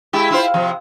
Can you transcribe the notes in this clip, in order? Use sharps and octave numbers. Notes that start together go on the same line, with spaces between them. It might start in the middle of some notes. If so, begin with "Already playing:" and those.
G#3 E4 G4
E4 F4 C5
C3 F3